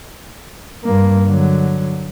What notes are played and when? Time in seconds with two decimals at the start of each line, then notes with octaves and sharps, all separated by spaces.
0.84 G2 A#3
1.26 D3 F#3